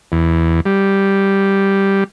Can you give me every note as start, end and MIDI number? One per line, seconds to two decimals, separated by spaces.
0.12 0.61 40
0.66 2.04 55